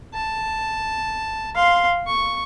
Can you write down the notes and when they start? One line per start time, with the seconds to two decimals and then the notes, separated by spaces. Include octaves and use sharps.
0.14 A5
1.55 F5 C6
2.07 C#6